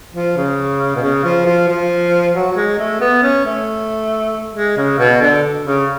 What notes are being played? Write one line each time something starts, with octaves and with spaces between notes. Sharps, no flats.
F3
C#3
B2
C#3
F3
F3
F3
F#3
F#3
G#3
A3
B3
C#4
A3
G#3
C#3
B2
D3
C#3